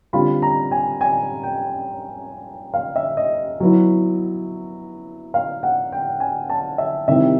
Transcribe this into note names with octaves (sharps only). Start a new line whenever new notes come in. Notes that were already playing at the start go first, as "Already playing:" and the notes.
D3 G3 C4 F4 B5
A#5
G#5
G#5
G5
F5
E5
D#5
F#3 B3 E4
F5
F#5
G5
G#5
A5
E5
C3 D#3 G3 C4 E4 E5